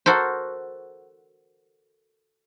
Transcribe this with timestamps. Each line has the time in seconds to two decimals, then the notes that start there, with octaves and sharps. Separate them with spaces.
0.06 F#4 A4 A#4 C5